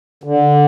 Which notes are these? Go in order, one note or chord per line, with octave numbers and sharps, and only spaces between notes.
D3